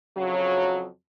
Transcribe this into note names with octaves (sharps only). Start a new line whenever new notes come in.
F2 C#3 F#3